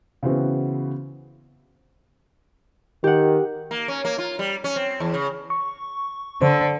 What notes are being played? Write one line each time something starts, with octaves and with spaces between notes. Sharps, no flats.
C#3 E3 B3 C4 E4 F#4
D#3 G4 F#5
A#3
C#4
A#3
F4
G3
C#4
C4
E2
C#3
C#6
D3 C5